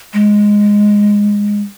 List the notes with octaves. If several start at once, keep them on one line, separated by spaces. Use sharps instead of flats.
G#3